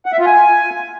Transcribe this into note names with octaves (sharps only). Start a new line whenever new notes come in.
F#5
E5
F4
G#5